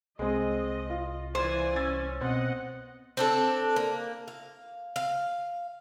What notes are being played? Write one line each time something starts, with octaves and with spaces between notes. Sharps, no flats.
C2 G#3 C4 D#5
F4
E3 C5 D5 G#5
C#4 E6 A6
B2 C4 D#5 F#5
C4 D4 A4
A#3
F5
F5